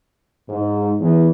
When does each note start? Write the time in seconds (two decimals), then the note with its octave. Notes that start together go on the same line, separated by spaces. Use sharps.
0.50 G#2
1.00 E2